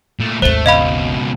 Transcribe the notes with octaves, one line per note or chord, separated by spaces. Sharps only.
A#2 A3
G#1 D#2 A3 C5 G7
C#2 B2 D#5 F5 B5